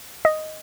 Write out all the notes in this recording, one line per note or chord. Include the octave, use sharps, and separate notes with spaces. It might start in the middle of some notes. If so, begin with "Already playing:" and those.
D#5